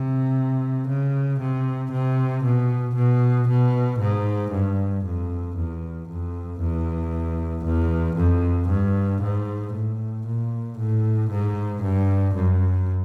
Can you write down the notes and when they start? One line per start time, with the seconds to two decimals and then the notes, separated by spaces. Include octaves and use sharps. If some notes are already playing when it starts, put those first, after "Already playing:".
Already playing: C3
0.88 C#3
1.40 C3
1.92 C3
2.44 B2
2.96 B2
3.48 B2
4.00 G#2
4.52 G2
5.05 F2
5.57 E2
6.09 F2
6.61 E2
7.65 E2
8.17 F2
8.69 G2
9.22 G#2
9.74 A2
10.27 A#2
10.78 A2
11.31 G#2
11.83 G2
12.35 F#2